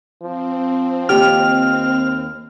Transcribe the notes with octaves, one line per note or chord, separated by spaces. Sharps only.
F3 C4
D#2 G4 G5 F6